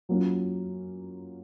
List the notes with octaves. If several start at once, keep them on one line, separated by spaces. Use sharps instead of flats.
F#3 A#3 C#4 F4